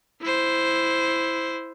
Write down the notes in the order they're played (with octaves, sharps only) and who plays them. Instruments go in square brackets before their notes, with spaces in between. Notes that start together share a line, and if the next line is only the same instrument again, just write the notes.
[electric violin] E4 C5